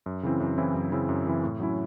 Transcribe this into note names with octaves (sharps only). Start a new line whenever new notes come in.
F#2
C#3 E3 C4 E4
F#2
C#3 E3 C4 E4
F#2
C#3 E3 C4 E4
F#2
C#3 E3 C4 E4
A2
F#3 C#4 E4